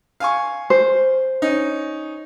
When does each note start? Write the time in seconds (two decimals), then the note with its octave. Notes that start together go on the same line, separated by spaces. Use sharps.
0.20 F5 G#5 C#6
0.70 C5
1.42 C#4 D#4